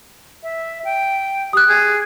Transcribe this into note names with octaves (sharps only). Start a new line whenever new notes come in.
E5
G5
G4 D#6 F#6
G#4